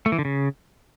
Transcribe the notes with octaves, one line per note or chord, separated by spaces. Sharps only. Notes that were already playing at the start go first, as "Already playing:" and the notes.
A3
E3
D3
C#3